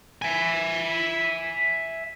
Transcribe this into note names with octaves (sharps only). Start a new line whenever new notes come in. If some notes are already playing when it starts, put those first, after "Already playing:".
E5 G#5